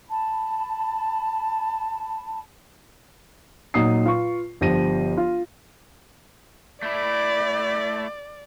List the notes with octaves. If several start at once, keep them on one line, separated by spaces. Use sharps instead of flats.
A5 B5
A#2 F#3 D#4 D#6 C7
F4 B4 C#6
G1 F3 G4 A#6 D#7
F4
A3 E4 D5